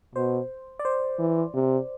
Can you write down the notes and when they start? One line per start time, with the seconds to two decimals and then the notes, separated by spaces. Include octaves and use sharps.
0.15 B2 C5
0.79 D5
0.85 C5
1.19 E3
1.54 C3